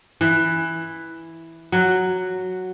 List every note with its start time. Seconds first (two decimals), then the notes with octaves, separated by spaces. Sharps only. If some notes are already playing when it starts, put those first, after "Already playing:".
0.21 E3
1.72 F#3